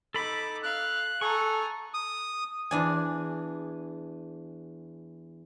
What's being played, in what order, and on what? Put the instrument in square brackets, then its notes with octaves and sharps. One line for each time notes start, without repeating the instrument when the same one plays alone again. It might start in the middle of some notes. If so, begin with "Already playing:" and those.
[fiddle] D#4 D6 [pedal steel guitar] A4 B5
[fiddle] F5 [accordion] F#6
[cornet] A4 [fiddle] G#5 A#5 [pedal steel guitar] C#6
[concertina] D#6
[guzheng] E2 D4 G#5